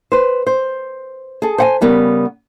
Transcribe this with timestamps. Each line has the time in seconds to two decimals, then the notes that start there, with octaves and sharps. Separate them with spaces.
0.12 B4 C5
0.47 C5
1.42 G#4 A4
1.58 C5 F#5 G#5
1.81 C#3 G3 B3 A#4